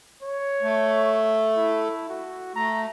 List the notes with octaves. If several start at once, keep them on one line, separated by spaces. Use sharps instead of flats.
C#5
A3
E4
F#4
A3 A#5